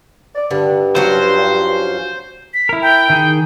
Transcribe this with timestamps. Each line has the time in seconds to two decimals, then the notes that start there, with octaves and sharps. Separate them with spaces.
0.34 D5
0.51 G2 D3
0.95 F3 F#3 C#4 C5
2.54 B6
2.69 E4 A#4
2.82 G5
3.10 D#3 G#4